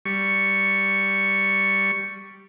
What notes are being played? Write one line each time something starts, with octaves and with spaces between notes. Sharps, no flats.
G3 C#6